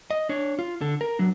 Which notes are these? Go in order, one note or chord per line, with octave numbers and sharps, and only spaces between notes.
D#5
D4 C#5
F4
D3 A4
A#4
F#3 D4